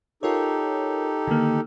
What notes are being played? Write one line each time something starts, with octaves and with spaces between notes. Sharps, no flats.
D#4 F4 G4 A4 A#4 C#5
D3 D#3 A#3